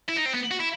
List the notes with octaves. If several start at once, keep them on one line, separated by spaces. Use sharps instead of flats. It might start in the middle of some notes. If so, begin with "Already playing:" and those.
E4
D#4
C4
B3
F#4
E4